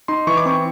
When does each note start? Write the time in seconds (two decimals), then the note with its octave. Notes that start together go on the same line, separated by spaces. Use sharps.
0.08 D#4 C6
0.27 E3 C#6
0.37 D6
0.46 C4 C#6